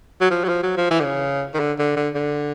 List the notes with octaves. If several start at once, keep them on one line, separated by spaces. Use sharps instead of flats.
F#3
F3
F#3
F3
F#3
F3
E3
D3
C#3
D#3
D3
D3
D3
D3